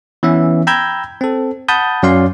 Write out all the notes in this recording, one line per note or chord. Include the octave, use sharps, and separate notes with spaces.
E3 B3 C#4 E5
G5 A#5 B5 E6 G6 G#6
C4 A4
F#5 A5 B5 D#6 G6
F#2 F#3 C#4 D5 F5 C6